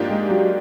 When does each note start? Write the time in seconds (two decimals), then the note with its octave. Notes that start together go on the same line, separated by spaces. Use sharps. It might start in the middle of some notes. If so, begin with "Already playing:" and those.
Already playing: G#2 F3 A#3 D4 G4
0.10 G#3
0.30 F#3